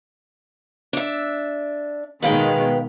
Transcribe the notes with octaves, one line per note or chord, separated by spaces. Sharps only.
D4 E5
B2 D#3 G#3 B4 F5 G5